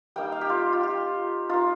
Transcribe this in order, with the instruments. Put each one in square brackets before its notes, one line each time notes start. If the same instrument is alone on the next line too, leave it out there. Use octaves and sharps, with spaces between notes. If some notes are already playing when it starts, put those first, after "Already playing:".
[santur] G3 A#3 D#4 G5
F5
G4
F4
F4
G4
A#3 D#4 F4